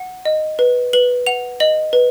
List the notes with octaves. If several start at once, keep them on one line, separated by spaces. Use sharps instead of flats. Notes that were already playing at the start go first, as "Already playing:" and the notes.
Already playing: F#5
D#5
B4
B4 F#7
F#5 F7
D#5 F#7
B4